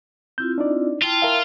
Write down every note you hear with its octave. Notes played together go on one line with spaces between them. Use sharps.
C4 E4 F4 G6
D4 D#4 D5
E4 F4 G5 A5
A#4 E5 F5